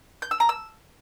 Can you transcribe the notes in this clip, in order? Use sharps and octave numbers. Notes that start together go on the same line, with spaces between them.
G6
E6
A#5
E6